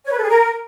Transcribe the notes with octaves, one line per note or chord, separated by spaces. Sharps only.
C#5
B4
A4
G#4
A#4